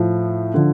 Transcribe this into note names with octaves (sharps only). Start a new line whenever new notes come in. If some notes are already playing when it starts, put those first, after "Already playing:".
Already playing: A2 F3
D3 F3